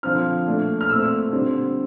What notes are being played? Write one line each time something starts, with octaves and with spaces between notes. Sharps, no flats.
D3 F3 C4 F6
A#2 A3 D4
F6
A#2 A3 C4 E6
D3 G3 C4